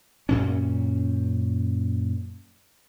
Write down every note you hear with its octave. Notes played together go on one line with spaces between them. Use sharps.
F#2 A#2 C#4